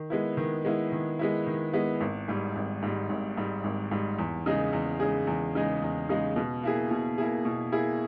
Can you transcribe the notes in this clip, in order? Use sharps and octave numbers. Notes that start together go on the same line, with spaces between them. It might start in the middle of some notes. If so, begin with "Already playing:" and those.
Already playing: D#3
G#3 B3 E4
D#3
G#3 B3 E4
D#3
G#3 B3 E4
D#3
G#3 B3 E4
G#1
G#2 G3
G#1
G#2 G3
G#1
G#2 G3
G#1
G#2 G3
E2
C#3 G#3 D#4 G#4
E2
C#3 G#3 D#4 G#4
E2
C#3 G#3 D#4 G#4
E2
C#3 G#3 D#4 G#4
B2
A#3 E4 G#4
B2
A#3 E4 G#4
B2
A#3 E4 G#4